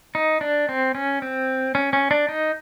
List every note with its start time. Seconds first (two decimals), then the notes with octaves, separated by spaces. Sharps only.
0.15 D#4
0.41 D4
0.69 C4
0.95 C#4
1.22 C4
1.75 C#4
1.93 C#4
2.11 D4
2.29 D#4